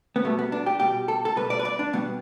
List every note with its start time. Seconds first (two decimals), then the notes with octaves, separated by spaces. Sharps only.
0.16 B3
0.24 B2 G3 A3
0.39 B3
0.52 D4
0.66 G4
0.80 B2 G3 G4
1.08 A4
1.25 A4
1.36 B2 G3 B4
1.50 D5
1.59 B4
1.65 D5
1.79 D4
1.93 B2 G3 B3